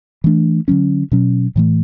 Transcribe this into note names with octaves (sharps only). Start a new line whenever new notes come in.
E3 A3 D4
D3 F#3 C#4
B2 F#3 C#4
A2 E3 A3